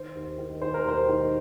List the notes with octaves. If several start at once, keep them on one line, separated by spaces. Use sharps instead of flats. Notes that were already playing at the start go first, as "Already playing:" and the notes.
Already playing: D#3 C5
D#2
D#3
D#3 C5
A#4
D#2 C5
D#3